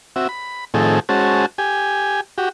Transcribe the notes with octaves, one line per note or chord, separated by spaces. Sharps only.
C4 F#4 E5
B5
A2 D#3 F3 C4 G#4 A4
G#3 C#4 F#4 C5 A5
G4 G#5
F#4 G4